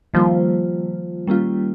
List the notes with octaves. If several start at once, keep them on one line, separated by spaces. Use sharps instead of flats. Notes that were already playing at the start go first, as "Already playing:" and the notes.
D#3 F3 G3 A#3 F4
D#3 G3 A#3 C#4 F4